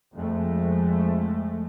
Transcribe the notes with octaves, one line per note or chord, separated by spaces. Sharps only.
F2 G#3 A3